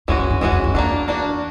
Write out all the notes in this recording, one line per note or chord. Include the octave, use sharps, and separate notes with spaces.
E2 E3 G#3 C#4 F#4
F2
F#2
E2 E3 G#3 C#4 F#4
F2
F2
E2 A#3 D4 F#4
A#3 D4 F#4